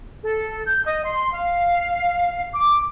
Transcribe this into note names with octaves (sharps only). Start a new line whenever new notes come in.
A4
G6
D#5
C6
F5
D6